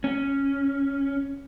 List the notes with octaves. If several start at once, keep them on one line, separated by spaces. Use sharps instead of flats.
C#4